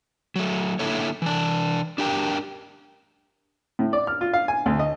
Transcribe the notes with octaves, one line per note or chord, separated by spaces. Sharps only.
F#3 A3
D3 A#3 E4 A4 C#5
E3 D4
D4 G4 A#4 G5
A2
D5
F6
F4
F5
G#5
D2
D#5